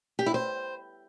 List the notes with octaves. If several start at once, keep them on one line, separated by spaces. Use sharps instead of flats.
G4
E4
C5